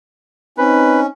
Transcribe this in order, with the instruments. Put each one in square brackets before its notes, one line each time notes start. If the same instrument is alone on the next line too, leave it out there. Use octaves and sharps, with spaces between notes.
[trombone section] C4 D#4 [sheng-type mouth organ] C#4 [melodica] B4